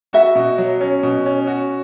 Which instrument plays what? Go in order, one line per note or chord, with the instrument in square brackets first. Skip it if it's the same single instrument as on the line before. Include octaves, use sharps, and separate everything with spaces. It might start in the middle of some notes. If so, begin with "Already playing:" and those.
[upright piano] F#4 [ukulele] E5
[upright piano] B2
F#3
C#4
B2
C#4
F#4